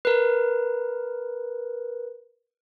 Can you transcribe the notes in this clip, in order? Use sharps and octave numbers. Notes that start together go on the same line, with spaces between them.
A#4 B4